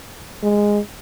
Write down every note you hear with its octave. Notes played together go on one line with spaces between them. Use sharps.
G#3